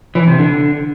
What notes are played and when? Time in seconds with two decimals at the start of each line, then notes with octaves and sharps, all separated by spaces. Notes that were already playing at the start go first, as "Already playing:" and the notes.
0.15 E3
0.27 C3
0.39 D3